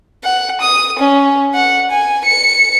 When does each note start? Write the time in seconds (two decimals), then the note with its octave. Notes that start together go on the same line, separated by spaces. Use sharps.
0.23 F#5
0.61 D#6
0.99 C#4
1.54 F#5
1.91 G#5
2.25 C#7